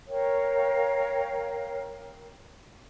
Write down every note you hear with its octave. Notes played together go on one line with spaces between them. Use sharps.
A#4 C#5 F5 G5